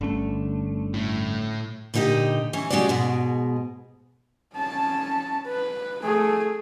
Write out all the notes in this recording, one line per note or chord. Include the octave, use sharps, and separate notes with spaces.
G1 D3 A3 C#4
A2
A#2 D3 D#4 G4 D#5
E3 C#4
G#3 C#4 F#4 G4 D5
G#2 B2 G#3
C#4 A5
B4
A3 G#4